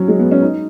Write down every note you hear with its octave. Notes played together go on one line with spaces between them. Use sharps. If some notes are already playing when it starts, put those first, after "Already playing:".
Already playing: F#3 C#4
G#3
B3
C#4
D#4